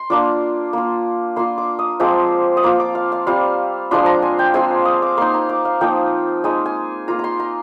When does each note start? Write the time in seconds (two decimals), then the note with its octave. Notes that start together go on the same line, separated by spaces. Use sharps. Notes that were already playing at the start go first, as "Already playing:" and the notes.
Already playing: C6
0.10 A#3 D4 F4 D6
0.73 A#3 F4
1.36 A#3 F4 C6
1.58 D6
1.79 D#6
2.00 F3 G#3 C4 D6
2.57 D#6
2.64 A#3 F4 D6
2.80 D6
2.95 F5
3.12 F5
3.27 G3 C4 F4 F5
3.91 F3 G#3 D4 F4 C6
4.06 A#5
4.22 G#5
4.39 G5
4.54 G#3 C4 F4 G#5
4.70 C6
4.85 D#6
5.02 D6
5.17 A#3 D#4 C6
5.34 A#5
5.49 D6
5.65 F5
5.81 F3 A#3 D#4 G5
6.44 G#3 D#4 G#5
6.66 G#5
7.08 A#3 F4 A#5
7.19 A#5 C6
7.39 A#5